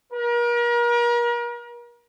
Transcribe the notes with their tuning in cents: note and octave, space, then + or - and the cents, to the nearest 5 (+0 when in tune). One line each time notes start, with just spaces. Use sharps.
A#4 +40